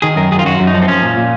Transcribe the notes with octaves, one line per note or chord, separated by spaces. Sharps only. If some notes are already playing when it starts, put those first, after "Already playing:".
D#3 G#4
F#2 A#4
F#2 G#4
F4
F#2 F#4
F#2
D#4
F3
C4
F3 C#4
A#2
A#2